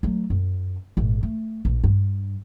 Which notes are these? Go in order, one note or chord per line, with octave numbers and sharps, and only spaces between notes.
F#3 A3
F#2
G#1 A#2
A3
A#1
G2